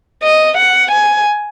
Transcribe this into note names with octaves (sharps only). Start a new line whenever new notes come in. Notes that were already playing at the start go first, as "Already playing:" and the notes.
D#5
F#5
G#5